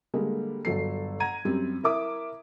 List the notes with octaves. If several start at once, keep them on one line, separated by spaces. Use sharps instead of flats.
D3 G3 G#3 A#3
G1 F#3 A4 C7
F#5 A#5 G#6 D#7
F#2 G3 C4
E4 A#4 E5 D6 D#6